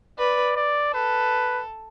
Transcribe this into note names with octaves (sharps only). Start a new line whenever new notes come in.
B4 D5
D5
A4 B4